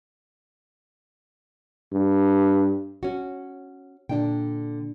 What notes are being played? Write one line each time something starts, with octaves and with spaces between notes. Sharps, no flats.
G2
C#4 F#4
A#2 D3 D4 G5